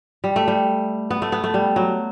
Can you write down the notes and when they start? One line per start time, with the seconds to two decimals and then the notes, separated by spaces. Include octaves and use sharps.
0.24 G3
0.36 A3
0.48 G3
1.11 B3
1.22 A3
1.32 B3
1.44 A3
1.54 G3
1.76 F#3